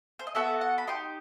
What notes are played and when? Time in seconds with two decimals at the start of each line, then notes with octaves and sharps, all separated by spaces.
0.19 C5
0.27 D#5
0.35 B3 F#4 A4 E5
0.61 F#5
0.78 B5
0.87 D#4 G4 C6